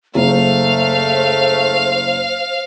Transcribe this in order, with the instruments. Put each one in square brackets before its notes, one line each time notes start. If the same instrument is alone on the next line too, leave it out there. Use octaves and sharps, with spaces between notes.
[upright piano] F#1 [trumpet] A3 [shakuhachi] C5 [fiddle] F5